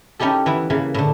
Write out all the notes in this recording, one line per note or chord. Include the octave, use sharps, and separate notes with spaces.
C#4 D#4 E4 G4 A4
E3 B3 E4
C#3 E3 A#3
A2 D3